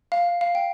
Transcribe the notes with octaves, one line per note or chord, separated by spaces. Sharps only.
F5
F5
G5